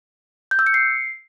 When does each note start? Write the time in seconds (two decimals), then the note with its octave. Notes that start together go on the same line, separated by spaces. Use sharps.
0.51 G6
0.59 E6
0.67 C#7
0.74 C7